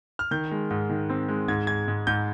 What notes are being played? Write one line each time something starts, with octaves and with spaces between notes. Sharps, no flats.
F6
D#3 G6
G#3
G#2
D#3
C4
G#3
G#2 G#6
G#2 G#6
G#2
G#2 G6